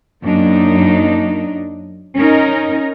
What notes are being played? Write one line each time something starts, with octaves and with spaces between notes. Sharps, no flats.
F#2 A#3 D4 D#4
C#4 D#4 A#4